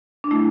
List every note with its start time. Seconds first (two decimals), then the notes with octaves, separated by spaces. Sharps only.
0.24 D4
0.31 A3 E4